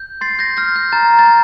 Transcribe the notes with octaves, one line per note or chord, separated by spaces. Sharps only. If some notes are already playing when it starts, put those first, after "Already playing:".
Already playing: G6
C6 A6 C7
G6 A#6
F6 G6 A#6
G6
A#5 A6
A6